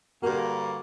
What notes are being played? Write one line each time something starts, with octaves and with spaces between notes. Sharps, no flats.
G2 D3 A#3 F#4 A#4